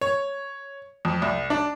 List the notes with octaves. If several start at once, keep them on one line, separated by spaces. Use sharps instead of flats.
C#5
F2
C2
D4